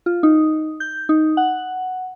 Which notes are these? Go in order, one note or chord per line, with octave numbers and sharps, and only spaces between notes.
F4
D#4
G6
D#4
F#5